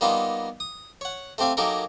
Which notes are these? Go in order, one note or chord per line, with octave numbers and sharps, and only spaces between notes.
G3 A#3 B3 D#4 F4
D#6
C#5 F#5
A3 C4 G4 F5 G#5
F#3 A#3 D#4 G4 A4 A#4